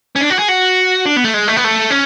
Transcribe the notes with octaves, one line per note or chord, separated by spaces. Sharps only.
C#4
D4
F#4
G#4
F#4
D4
B3
A3
G#3
A3
B3
A3
C#4